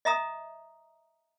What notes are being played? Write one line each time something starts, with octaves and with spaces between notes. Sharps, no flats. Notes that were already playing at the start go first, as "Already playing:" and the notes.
D#5 E5 A#5 D#6